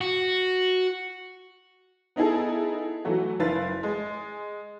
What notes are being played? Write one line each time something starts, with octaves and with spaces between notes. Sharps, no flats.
F#4
B3 D#4 E4 G#4 A4
E3 F#3 A3 F#4
F#1 E4 B4 F5 A6
G#3